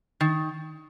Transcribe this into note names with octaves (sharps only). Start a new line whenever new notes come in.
D#3